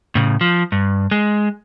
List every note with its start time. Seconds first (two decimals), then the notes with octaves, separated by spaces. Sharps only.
0.15 A2 C#3
0.41 F3
0.72 G2
1.11 G#3